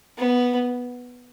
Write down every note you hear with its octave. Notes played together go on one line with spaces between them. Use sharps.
B3